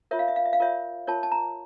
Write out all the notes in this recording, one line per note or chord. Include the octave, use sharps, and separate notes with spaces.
F4 A#4 C#5 E5
F5
E5
F5
E5
F5
F4 A#4 C#5 E5
F4 A#4 C#5 A5
A5
A#5